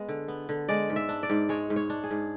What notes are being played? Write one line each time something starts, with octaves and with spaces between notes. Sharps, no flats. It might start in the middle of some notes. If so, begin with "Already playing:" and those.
Already playing: G#3 B3
D3
B3
D3
G#3 D5
G#2
E5
D4
D5
G#2
G#3 C#5
G#2
C#5
D4
G#4
G#2